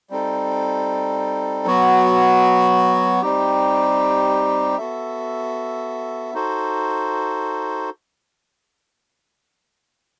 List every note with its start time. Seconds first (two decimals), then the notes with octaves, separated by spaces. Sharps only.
0.10 G3 C4 D#4 A4
1.66 F#3 B3 F#4
3.22 G3 C4 D#4 G4
4.78 B3 F#4 A4 E5
6.34 D#4 F#4 A4 C5